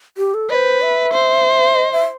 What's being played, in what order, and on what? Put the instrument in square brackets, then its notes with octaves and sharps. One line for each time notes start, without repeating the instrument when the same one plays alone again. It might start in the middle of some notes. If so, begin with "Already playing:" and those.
[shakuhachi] G4
A4
[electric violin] B4 [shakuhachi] D#5
[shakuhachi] C5
E5
[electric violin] C5
[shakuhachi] D#5
E5